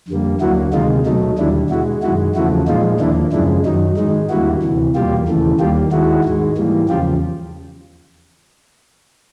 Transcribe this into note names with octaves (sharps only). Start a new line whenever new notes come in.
F2 D3 G3 A#3
D2 D3 F#3 A#3 E4 F#4
D2 C3 D#3 G#3 D#4 F4
B2 F#3 A3 D#4
D#2 D3 G3 D4 E4
B2 G#3 E4 F#4
F#2 D#3 G#3 E4 F#4
E2 C#3 F3 A3 E4 F#4
A#2 F3 G#3 D#4 F4
D#2 D3 F3 A#3 D4 E4
F#2 C#3 F3 G#3 D4 E4
F#2 D#3 F#3 D#4
G#2 D#3 G#3 D#4
D#2 D3 G3 A#3 E4 F#4
D2 C3 E3
E2 B2 G3 A#3 F4 G4
D#2 C#3 E3 A3
D#2 D#3 G3 A#3 F4 G4
D#2 D#3 G#3 E4 F#4
G#2 D#3 G#3
G#2 E3 G3 A#3
E2 C#3 F3 F4 G4